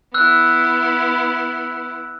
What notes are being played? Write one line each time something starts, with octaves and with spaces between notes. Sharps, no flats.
B3 E4 E6 F#6